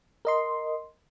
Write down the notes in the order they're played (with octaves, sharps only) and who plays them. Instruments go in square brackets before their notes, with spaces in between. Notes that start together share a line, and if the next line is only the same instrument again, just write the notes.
[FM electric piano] A#4 D#5 C6